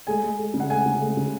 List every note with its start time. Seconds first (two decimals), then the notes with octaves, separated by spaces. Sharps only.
0.07 G#3 G#5
0.23 G#3
0.39 G#3
0.54 C#3
0.60 F#5
0.70 G#3 G#5
0.86 C#3
1.01 G#3
1.17 C#3